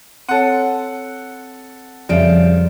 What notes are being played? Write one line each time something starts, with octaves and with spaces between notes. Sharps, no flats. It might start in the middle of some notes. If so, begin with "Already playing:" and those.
C4 A4 C#5 F#5
F2 C#3 F3 G3 D5 E5 D7